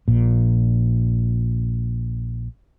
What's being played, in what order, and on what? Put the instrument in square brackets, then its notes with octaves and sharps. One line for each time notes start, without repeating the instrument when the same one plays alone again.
[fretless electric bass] A#1 A#2